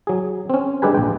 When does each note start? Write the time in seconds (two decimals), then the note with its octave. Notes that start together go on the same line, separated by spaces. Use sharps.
0.07 F#3 G#4
0.50 C4 C#4
0.82 G#3 D4 G4 A4 B4 G#5
0.95 A#1 G5